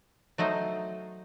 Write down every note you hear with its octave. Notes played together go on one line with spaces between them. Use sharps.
F#3 A3 D#4 C5